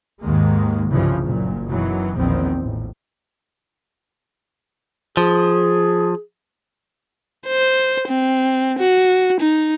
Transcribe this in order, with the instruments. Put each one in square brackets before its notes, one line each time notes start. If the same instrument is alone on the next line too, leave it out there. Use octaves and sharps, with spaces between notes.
[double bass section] D#2 G#2 D#3 G#3 A#3
F1 C2 G2 C#3 E3 F3
F#1 A#2
F#2 B2 D#3 E3 F#3
A#1 E2 D#3 F3 C4
A1
[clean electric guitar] F3 [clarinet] G#4
[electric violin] C5
C4
F#4
D#4